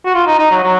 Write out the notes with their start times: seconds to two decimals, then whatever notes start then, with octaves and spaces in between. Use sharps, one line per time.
0.05 F#4
0.14 F4
0.26 D#4
0.39 D#4
0.51 F#3
0.63 F#3